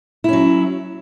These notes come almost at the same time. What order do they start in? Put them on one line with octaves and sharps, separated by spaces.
E4 C#4 F#3